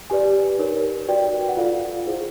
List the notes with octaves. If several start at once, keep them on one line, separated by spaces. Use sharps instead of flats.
G4 B4 D5 G#5
D#4 G4 A#4 C#5
F#4 B4 D5 G5
F#5
F4 A4 D5 F5
E4 G#4 C5